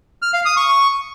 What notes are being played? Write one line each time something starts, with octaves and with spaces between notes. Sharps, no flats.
F6
F5
D#6
C#6